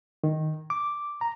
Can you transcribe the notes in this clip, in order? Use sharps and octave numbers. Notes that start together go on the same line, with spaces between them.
D#3
D6
A#5